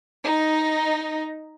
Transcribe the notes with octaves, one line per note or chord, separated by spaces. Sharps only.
D#4